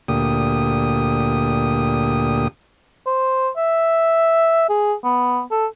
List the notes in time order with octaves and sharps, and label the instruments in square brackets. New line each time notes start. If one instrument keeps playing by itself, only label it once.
[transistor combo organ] D2 A#2 G4 D#6
[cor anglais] C5
E5
G#4
B3
A4